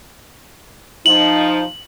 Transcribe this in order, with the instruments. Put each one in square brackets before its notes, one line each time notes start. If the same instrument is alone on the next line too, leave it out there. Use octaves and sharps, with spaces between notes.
[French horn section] F3 D#4 [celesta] F#7